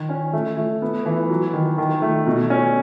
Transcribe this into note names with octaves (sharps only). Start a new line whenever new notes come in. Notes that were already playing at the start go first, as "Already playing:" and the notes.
Already playing: D#3
C#4
A3
A3
B3
E3
F#3
D#3
D#3
A3
B2
C#4